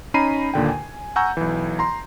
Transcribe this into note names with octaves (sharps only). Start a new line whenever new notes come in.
C#4 D#4 A#5 B5 C7 D#7
D#2 A#2 D3 G5
G#5
F#5 G#5 A#5 C#6 E6 G6
B1 E3
A#5 C6